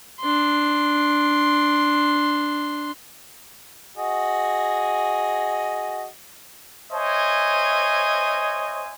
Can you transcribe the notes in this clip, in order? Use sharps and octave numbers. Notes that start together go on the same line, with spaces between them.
D4 C6
F#4 G#4 D#5
C5 C#5 D#5 E5 G#5